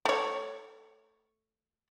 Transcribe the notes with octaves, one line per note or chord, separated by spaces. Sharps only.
A3 C#5